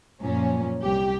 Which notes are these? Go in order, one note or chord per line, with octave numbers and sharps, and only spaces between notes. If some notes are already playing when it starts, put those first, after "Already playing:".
F#2 A#2 F3 C#4
C2 G4